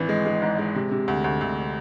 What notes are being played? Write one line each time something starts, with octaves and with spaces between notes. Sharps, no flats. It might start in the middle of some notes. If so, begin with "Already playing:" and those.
Already playing: G#1 E3
G#3
G#3
G#2
G#3
C3
C3
D2
D2
D2